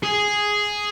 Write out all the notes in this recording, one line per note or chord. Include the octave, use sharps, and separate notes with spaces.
G#4